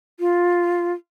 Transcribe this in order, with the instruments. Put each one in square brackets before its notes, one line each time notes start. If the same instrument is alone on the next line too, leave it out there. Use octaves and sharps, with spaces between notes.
[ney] F4